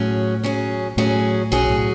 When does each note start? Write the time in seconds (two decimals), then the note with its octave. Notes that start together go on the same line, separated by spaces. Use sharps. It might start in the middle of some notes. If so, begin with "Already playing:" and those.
Already playing: A2 F#3 A3 C#4 G#4
0.44 F#3 C#4 G#4
0.97 A2 F#3 A3 C#4 G#4
1.52 B1 B2 F#3 C#4 G#4
1.69 A2